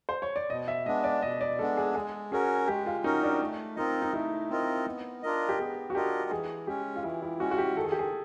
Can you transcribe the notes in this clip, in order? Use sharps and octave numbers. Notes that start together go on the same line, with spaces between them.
C5
C#5
D5
B2 D#5
E5
G#3 B3 D4 D#5
D5
B2 D#5
D5
G#3 B3 D4 A4
G#4
G#3 G#4
C#4 F#4 G#4 A#4
G#3 G4
F4
C#4 D#4 F#4 A#4
D4
A3
C4 D#4 F4 A#4 D#5
D#4
A3 E4
C4 F4 A#4 D#5
B3
D4 F4 A#4 D#5
G4
B3 G#4
F#4
D4 F4 G4 A#4 D#5
E3 G#4
G#3 C#4 G4
F4
E3 E4
E4
G#3 C#4 F#4
F#4
G4
D#3 A4
G#4
G4
G#4